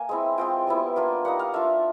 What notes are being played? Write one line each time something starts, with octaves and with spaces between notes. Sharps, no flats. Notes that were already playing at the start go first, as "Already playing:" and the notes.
Already playing: A#3 G#5
G#3 C4 E4
G#3 C4 F4 G5
G3 B3 E4
A#3 D4 F4
G3 A#3 D#4 F#5
F5
A3 D4 F4 E5